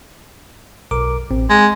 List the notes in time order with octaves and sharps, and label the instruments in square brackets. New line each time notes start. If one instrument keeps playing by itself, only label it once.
[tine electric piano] B1 A#4 D6
A1 C4
[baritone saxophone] G#3 [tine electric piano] G#5